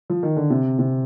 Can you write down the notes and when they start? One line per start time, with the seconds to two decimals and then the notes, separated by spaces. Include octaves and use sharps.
0.10 F3
0.23 D#3
0.37 D3
0.50 C3
0.79 C3